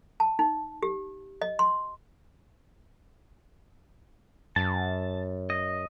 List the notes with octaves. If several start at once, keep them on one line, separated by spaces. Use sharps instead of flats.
A5
D#4
G4
D#5
C6
F#2 A5
D#5